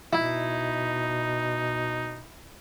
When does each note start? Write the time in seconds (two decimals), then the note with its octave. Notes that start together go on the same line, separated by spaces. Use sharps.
0.13 B2 D#4 E4